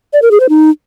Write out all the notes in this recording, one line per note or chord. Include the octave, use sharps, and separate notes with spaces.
D5
A#4
G#4
C5
D#4